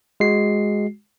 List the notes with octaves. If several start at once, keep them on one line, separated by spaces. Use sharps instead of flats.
G#3 F#4 C7